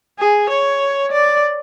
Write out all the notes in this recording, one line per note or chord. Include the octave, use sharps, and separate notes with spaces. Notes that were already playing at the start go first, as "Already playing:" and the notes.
G#4
C#5
D5